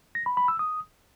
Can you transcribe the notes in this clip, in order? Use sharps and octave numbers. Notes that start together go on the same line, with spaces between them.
A#6
B5
B5
E6
D#6